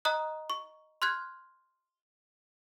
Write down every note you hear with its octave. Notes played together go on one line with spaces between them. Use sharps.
D#5 A#5 D#6 F#6
C#6
C6 F6 F#6 G#6